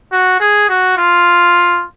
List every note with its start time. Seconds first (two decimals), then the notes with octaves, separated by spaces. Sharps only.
0.12 F#4
0.40 G#4
0.69 F#4
0.97 F4